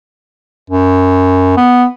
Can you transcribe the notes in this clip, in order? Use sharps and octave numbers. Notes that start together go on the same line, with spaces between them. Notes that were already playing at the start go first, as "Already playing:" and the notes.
F#2
B3